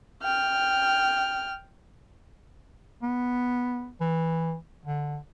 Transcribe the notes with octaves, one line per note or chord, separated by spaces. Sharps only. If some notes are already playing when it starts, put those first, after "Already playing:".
G5 F6
B3
E3
D3